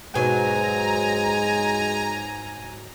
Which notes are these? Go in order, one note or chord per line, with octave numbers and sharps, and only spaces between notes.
G#2 B2 F#3 G#3 G#5 A#5